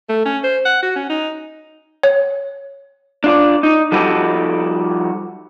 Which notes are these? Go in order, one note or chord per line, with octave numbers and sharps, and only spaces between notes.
A3
C#4
C5
F#5
F#4
C#4
D#4
C#5
D4 F4 D5
D#4
F3 G3 D#4 F#4 G4 A4